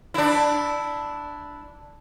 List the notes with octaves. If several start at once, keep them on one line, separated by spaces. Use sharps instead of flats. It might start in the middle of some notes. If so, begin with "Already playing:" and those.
D4 E4